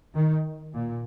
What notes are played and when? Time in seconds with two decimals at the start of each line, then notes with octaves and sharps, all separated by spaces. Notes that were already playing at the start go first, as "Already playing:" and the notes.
0.15 D#3
0.73 A#2